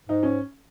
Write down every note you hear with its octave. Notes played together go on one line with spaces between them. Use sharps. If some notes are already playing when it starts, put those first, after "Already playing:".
G#2 D#4
C#4